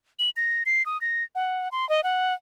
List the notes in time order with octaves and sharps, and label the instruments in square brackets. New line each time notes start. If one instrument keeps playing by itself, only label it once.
[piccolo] F#7
A#6
C7
D#6
A#6
F#5
C6
D#5
F#5